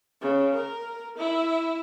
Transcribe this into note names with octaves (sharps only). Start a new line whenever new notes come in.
C#3
A#4
E4